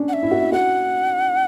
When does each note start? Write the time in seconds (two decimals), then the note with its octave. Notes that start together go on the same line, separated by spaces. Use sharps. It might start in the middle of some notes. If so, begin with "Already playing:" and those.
Already playing: C#4 D4
0.08 F#5
0.13 E5
0.23 E4
0.31 F#4
0.40 E4
0.52 F#4 F#5